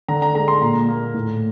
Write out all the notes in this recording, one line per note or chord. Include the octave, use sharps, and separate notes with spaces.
D3 A#5
A#5
G#3 A#5
C6
A#2 A#5
A#3
A2